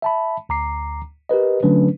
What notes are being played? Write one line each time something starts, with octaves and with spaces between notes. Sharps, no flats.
E5 A5 B5
D2 A#5 D6 C7
G4 A#4 B4 D#5
D3 F#3 A3 C#4 D4 B4